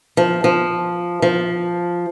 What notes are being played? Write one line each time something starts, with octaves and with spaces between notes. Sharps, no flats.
F3
F3
F3